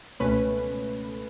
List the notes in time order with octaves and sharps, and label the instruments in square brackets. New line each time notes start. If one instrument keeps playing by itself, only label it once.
[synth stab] C#2 B2 A3 C#4 B4